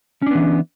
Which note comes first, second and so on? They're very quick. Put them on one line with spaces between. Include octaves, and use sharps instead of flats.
C#4 D4 B3 E3